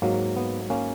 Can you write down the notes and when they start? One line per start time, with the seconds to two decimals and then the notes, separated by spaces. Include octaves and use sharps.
0.02 G#2 F#3 A#3
0.36 B3
0.70 A#3 C#4